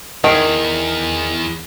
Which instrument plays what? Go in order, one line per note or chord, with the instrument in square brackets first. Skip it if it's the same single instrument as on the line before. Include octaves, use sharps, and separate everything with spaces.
[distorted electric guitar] E2 [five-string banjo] D#3